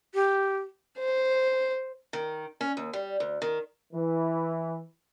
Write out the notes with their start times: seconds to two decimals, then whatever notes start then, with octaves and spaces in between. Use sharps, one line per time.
0.14 G4
0.98 C5
2.13 D#3
2.61 C#4
2.77 D#2
2.93 G3
3.20 D2
3.42 D#3
3.93 E3